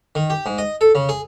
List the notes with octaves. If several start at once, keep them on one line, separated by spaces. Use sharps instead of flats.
D#3
G4
G#2
D#5
A4
C#3
G#4